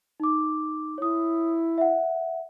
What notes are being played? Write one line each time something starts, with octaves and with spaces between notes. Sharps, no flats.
D#4 D6
E4 C#5 D#6
E5 F#5